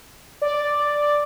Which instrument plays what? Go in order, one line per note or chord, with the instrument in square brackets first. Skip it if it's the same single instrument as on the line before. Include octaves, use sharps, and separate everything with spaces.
[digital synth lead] D5